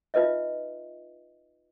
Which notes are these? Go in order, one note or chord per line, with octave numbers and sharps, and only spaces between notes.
D#4 F4 B4 D#5 E5